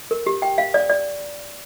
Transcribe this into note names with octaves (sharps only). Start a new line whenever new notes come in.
A#4
G4
G5
F5
D5
D5